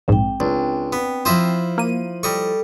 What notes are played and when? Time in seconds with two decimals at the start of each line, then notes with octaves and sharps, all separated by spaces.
0.08 A#1 G#2 C4 G5
0.40 C#2 D4
0.93 B3
1.25 F3 E4 F4 C5 D#5 E5
1.78 A#3 D#7
2.23 G3 A4 D#5 C#6